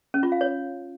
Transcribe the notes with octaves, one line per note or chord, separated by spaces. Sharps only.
C#4
F4
F5
C#5